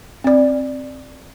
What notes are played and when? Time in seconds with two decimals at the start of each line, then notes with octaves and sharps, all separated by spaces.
0.24 C4 D5